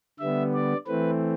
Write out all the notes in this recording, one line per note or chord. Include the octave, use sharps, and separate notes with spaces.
D3 G3 B3 E5
D5
E3 A3 C4 B4